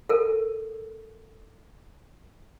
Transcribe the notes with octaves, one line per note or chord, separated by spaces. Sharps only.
A4 A#4